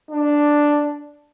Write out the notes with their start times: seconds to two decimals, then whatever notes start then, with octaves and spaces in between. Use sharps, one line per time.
0.11 D4